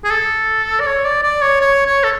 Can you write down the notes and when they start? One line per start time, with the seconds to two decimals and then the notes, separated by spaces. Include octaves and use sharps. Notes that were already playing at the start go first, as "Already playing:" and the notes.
0.04 G#4
0.11 A4
0.80 D5
0.86 C#5
1.05 D5
1.23 D5
1.42 C#5
1.61 C#5
1.86 C#5
2.04 A4